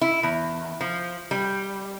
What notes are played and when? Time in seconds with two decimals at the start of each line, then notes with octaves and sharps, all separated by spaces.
0.01 E4
0.23 E2
0.81 F3
1.31 G3